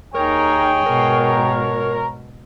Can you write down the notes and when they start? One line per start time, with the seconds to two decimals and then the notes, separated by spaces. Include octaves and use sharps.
0.15 D#2 D#4 G#4 A#4 C#5 G5
0.86 G#2 B2 A#4